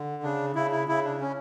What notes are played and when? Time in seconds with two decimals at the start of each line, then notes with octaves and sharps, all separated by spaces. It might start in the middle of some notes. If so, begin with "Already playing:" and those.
Already playing: D3
0.23 C#3 D4
0.55 C#3 E4
0.72 E4
0.88 C#3 E4
1.05 D4
1.21 C#4